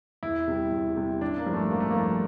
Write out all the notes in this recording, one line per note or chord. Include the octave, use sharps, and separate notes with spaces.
E2 E4
C3 G3
E2
C3 G3
A1 D4
A#3
G2 F3
A3
A1 A#3
A3
G2 F3 A#3